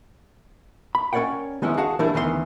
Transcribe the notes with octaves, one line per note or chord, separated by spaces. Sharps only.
B5
C#4 A#4 C#5 D5 F#5 G5
D#3 F3 G#3 B3 C#4 E4
F#4 G#4 F5 F#5 A5
E3 G3 A3 D4 E4 A#4
D2 D#3 E3 B3 C5 C6